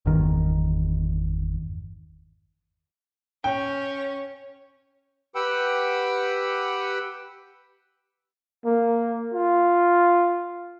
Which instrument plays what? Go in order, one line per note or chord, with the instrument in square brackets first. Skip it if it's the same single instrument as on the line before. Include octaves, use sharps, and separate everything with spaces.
[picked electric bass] G1 E2 D#3
[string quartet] C#4 C#5 [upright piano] G5
[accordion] G4 B4 F#5 G5 B5 E6
[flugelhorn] A#3
F4